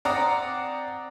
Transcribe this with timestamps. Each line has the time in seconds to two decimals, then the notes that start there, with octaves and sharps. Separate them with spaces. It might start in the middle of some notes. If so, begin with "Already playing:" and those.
0.05 C4 D5 F#5 A#5 D#6